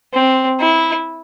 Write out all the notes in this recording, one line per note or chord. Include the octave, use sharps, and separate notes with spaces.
C4
E4